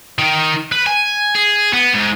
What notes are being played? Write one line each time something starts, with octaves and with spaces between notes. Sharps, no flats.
D#3
B4
G#5
G#4
B3
G#2